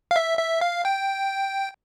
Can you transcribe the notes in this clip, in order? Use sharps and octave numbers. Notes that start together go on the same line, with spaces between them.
F5
E5
E5
F5
G5